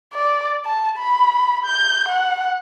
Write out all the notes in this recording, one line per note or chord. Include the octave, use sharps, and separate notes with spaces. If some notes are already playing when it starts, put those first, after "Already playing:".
D5
A5
B5
G6
F#5